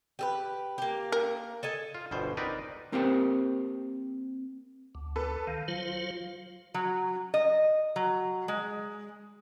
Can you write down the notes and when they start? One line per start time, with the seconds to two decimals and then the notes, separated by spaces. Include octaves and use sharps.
0.19 G4 A4 B4
0.78 A#3 G4
1.12 A#4
1.63 A4 D#5 G#5
1.95 F4
2.11 G1 G2 B2 C5
2.37 C4 D#4 A#4 B4 D5
2.92 A#3 C4 G4 A#4 C5 G5
4.95 D2
5.16 A4 B4
5.47 D#3 F5
5.68 F#3 F4 C5
6.74 F#3
7.34 D#5
7.96 F#3
8.48 G#3